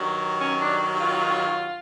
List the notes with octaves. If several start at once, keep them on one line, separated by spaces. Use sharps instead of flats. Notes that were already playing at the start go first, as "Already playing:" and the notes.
Already playing: G2 D#3 F#3
C#4
D4
F4